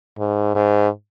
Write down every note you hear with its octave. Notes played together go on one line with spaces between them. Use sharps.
G#2
G#2